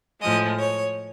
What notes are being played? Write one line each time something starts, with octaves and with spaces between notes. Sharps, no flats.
A2 F3 G#3 D#5
C#5